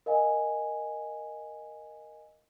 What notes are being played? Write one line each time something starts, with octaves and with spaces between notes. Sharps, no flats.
A#4 D#5 F5 G#5